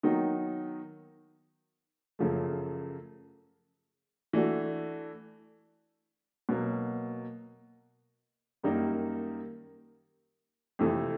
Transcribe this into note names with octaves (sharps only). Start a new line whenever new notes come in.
D#3 F#3 B3 D#4
F#2 C#3 F3 A3
E3 A3 D4 F#4
B2 F#3 A#3
F#2 D#3 G3 A#3 D#4
F2 C3 E3 A3 C4